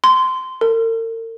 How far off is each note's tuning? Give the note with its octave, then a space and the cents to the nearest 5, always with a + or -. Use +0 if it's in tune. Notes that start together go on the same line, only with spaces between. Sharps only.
C6 -15
A#4 -45